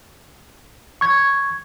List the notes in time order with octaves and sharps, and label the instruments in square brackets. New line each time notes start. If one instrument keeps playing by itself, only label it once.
[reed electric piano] C#6 G#6